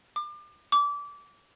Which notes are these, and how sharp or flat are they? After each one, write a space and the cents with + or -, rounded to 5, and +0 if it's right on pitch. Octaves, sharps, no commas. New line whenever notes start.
D6 +35
D6 -25